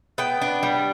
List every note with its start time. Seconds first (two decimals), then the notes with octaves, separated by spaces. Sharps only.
0.18 B3 G5
0.42 D4
0.63 G3